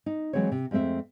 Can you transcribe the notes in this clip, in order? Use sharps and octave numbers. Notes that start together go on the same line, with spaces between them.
D#4
E3 F#3 G#3 C4 C#5
C3
F2 G#3 A3 C4 E5